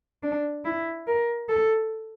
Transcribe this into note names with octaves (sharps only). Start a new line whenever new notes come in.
D4
E4
A#4
A4